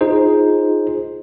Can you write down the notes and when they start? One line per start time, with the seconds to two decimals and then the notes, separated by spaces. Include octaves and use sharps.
0.01 D#4 F4 G#4 C5